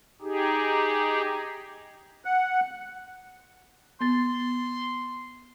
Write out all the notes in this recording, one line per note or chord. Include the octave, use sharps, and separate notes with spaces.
D#4 G4 G#4
F#5
B3 C6 A6